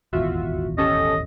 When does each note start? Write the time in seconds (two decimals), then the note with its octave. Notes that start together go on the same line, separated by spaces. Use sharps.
0.13 D#1 G#1 E2 F4 F#4 E5
0.78 C#4 G4 A4 D#5